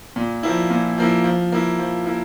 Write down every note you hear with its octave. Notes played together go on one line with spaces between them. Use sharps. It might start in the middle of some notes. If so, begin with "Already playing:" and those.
A#2
F3 A#3 E4
A#2
F3 A#3 E4
F3
A#3 E4
F3
A#3 E4